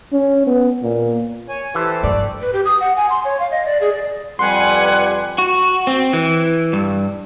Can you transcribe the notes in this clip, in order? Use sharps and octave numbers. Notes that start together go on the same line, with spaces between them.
C#4
B3
A#2
C#5 G#5
E3 G4 A4 C5
G2 A3 D5
B4
G4
D#6
F#5
G#5
C6
C#5
F5
D#5
D5
G#4
D5
F2 G3 B4 F#5 G#5 C6
F#4
C4
E3
G2